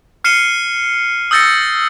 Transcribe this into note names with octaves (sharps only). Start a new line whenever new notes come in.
F6 C7 C#7 D#7 E7 G7
D#6 E6 G6 A6 A#6 C#7